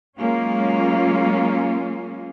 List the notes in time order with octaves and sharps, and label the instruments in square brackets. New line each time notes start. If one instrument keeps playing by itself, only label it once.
[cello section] F#3 G#3 A#3 C#4 F4